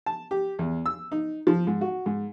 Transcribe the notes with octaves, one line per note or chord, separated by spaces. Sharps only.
A5
G4
E2
E6
D#4
F3
G#2
F#4
G#2